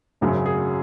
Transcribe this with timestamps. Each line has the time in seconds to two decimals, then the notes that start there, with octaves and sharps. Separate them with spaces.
0.21 G#1 F#2 C#3 F#3
0.46 G#4